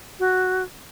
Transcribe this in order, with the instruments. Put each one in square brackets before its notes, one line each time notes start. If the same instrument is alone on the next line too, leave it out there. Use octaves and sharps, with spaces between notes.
[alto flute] F#4